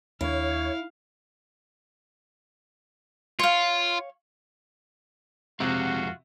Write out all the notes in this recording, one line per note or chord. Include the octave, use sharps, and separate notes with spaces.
D#2 D4 E4 C#5 F5
F4 C#5 F5
F2 C3 G#3 F4 F#4